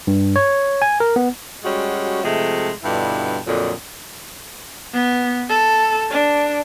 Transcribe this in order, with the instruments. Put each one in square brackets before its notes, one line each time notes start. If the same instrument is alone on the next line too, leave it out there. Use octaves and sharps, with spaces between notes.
[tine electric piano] G2
C#5
G#5
A#4
B3
[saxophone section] G3 G#3 C#4 F#4
C3 F3 G#3 A3
G2 B2 D3 E4 F4
F2 A#2 D3 F#3 D#5
[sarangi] B3
A4
D4